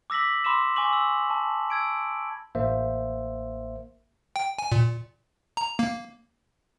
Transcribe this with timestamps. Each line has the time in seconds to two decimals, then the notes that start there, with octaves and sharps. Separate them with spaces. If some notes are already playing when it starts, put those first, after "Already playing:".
0.10 D6 E6 A#6 B6 F#7
0.44 B5 C6 D6 E6 E7
0.76 G#5 C#6 D6 F#7
0.93 E6
1.30 A5
1.70 E6 G#6 D7
2.55 A1 A#3 C5 E5
4.36 G5
4.59 G#5
4.72 A#2
5.57 A#5
5.79 A#3